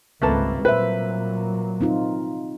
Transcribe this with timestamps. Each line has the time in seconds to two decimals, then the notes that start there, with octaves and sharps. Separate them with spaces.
0.22 G#1 C#2 G3 A3 A#3 C4 B4 A5
0.65 A#2 F#3 B4 C5 E5
1.81 C4 D#4 F4